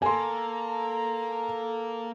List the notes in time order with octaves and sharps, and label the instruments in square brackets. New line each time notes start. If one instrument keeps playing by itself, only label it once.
[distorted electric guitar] A#3 [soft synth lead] A4 [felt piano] G#5 C6 [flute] A#5